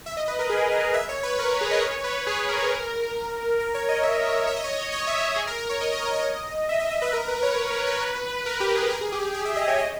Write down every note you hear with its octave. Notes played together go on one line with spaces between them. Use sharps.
E5
D#5
B4
A#4
G#4
D#5
E5
C#5
B4
A#4
A#4
G#4
D#5
C#5
B4
G#4
G#4
A#4
A#4
A#4
C#5
D#5
E5
D#5
E5
D#5
C#5
D#5
C#5
E5
D#5
G#4
A#4
A#4
C#5
D#5
D#5
D#5
C#5
D#5
E5
D#5
D#5
B4
A#4
B4
C#5
C#5
B4
A#4
G4
G#4
A#4
G#4
G4
G#4
G#4
E5
D#5
C#5
D#5